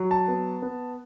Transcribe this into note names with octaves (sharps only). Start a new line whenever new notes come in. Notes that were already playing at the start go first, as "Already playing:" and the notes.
Already playing: F#3
A5
B3
B3